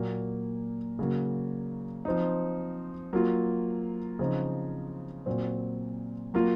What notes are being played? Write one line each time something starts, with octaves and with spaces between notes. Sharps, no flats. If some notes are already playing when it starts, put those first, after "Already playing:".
Already playing: A#2 F#3 A#3
C#3 F#3 A#3
F3 C4 D#4
F#3 A#3 F4
C#3 F3 C4 D#4
A#2 F#3 C4
F#3 A#3 F4